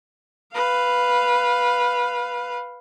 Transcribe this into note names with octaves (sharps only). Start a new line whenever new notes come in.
B4 F5